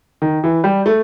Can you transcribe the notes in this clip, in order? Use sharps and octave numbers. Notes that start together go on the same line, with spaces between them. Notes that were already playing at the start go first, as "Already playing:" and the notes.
D#3
E3
G3
A3